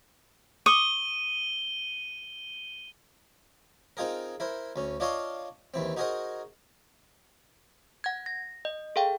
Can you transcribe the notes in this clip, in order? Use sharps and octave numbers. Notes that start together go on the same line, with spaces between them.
C#6 D#6 D#7 G7
C4 D#4 F4 G#4 A#4
E4 A#4 C5
D2 C#4
D4 F4 C#5 D#5 F5 C6
D#2 E3 C4
D#4 F#4 G#4 A#4 C5 D#5
F#5 G#6
A#6
D#5
G#4 A4 F5 G5